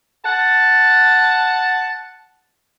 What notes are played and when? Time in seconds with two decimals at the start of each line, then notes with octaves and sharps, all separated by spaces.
0.24 F#5 A5